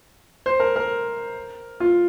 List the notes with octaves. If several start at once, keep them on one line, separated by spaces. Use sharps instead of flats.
C5
A#4
A#4
F4